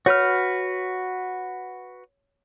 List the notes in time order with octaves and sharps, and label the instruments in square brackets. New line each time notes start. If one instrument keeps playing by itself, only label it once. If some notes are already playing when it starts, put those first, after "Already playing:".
[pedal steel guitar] F#4 B4 F6 [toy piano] C#5